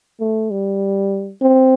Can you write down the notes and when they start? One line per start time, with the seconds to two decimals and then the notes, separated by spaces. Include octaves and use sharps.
0.20 A3
0.51 G3
1.42 C4